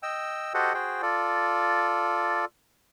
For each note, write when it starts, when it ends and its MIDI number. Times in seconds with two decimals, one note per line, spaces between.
0.03 0.53 75
0.03 0.53 79
0.03 0.53 88
0.54 0.73 66
0.54 0.73 67
0.54 0.73 69
0.54 0.73 72
0.54 0.73 75
0.54 0.73 78
0.74 1.02 66
0.74 1.02 68
0.74 1.02 72
0.74 1.02 79
1.02 2.45 65
1.02 2.45 69
1.02 2.45 74